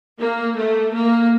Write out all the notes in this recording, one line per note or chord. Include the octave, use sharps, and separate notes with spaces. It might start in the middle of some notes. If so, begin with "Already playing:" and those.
A#3
A3
A#3